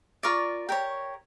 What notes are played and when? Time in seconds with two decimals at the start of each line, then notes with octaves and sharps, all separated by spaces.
0.23 F4 A#4 D5 C#6
0.69 G4 A#4 C#5